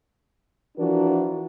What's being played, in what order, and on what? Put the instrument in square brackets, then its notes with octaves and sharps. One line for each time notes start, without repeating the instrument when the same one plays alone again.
[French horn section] E3 F3 D4 F#4 A#4